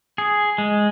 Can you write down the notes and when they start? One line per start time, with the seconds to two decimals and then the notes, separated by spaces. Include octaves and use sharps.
0.18 G#4
0.58 G#3